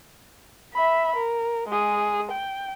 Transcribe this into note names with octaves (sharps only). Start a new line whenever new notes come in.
E5 B5
A#4
G#3 G#4
G5